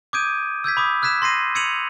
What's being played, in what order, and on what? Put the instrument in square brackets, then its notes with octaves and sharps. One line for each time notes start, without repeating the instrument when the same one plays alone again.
[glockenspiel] D6 D#6 G6 G#6 D7 D#7
E6 G6 G#6 B6
B5 D6 D#6
E6 F#6 G#6 B6 E7
C6 A#6 C7 D#7
E6 G#6 C#7 D#7 F7 F#7